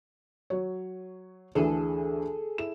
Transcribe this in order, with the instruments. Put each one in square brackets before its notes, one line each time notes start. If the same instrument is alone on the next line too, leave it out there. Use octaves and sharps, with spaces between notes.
[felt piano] F#3 C#5
[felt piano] D2 E3 E4 [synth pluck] G#4 A4
[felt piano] E4 E7